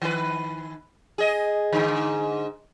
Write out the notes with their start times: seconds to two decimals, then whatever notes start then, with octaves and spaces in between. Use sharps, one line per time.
0.02 D#3 B4
1.18 G#4 D#5
1.73 G#2 D3